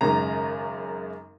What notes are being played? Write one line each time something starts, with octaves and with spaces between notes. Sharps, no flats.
G#1 F#2 C#3 A#5